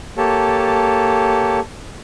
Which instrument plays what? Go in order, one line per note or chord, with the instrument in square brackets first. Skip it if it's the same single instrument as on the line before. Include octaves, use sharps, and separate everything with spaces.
[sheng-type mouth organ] A#3 G4 A4 C#5 A5